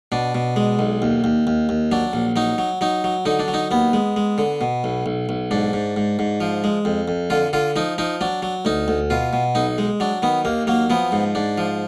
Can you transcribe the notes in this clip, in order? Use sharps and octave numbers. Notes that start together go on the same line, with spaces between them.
B2 D4
B2
G#3
B1
D#2
D#2
D#2
D#2
F#3 D4
A#1
F#3 D#4
F#3
F#3 D#4
F#3
D3 D#4
D4
F#3
D#4
D#2 B3
G#3
G#3
D3
B2
B1
B1
B1
G#2 D4
G#2
G#2
G#2
F3
G#3
F2
F2
D3 F4
D3 F4
F3 D#4
F3 D#4
F#3 D4
F#3
D2 D#4
D2
B2 F4
B2
B1 D#4
G#3
F#3 D4
D#3 B3
D#2 A#3
F#3 A#3
F3 B3
G#2
G#2 D4
F3